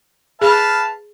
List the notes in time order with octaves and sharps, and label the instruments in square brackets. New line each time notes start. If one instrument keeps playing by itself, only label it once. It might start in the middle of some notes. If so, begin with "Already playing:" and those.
[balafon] G#4 [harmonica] B4 F5 A5